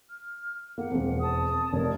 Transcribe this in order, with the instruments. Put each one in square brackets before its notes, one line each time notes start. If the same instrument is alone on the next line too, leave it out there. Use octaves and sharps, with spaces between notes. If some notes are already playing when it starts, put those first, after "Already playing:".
[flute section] F6
[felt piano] A#3 [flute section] F#5
[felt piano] E1 F2
[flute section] A5 D#6
[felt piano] F1 [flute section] A#4 C#5 D5